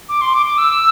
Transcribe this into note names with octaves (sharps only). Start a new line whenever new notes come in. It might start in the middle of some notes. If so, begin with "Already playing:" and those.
D6
C6
D6
D6
E6